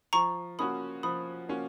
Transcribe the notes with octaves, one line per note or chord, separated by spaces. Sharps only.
F3 A#5 C#6
A#3 C#4 F#4 B5 D#6
F3 B5 D#6
A#3 C#4 F#4